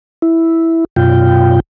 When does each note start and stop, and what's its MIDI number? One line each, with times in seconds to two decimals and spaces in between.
0.22 0.85 64
0.96 1.60 42
0.96 1.60 47
0.96 1.60 65
0.96 1.60 79